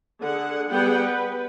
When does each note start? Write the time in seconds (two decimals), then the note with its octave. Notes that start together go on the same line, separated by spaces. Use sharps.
0.20 D3 G#4 F#5
0.71 G3 B3 G#4 F#5 G5
1.02 B4